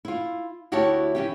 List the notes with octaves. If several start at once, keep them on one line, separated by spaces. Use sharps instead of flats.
E4 F4
D2 E4 F#4 G4 C#5 A5
E3 C#4 G4